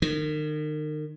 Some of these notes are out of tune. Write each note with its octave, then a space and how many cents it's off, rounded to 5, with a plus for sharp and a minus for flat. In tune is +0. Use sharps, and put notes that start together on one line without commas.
D#3 -35